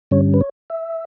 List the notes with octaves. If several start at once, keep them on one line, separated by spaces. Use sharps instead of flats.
G2 D3 G3 C#4 C#5
B4
C#5
E5